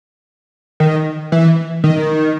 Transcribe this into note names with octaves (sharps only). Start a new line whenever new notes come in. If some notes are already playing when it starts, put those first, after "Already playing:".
D#3
E3
D#3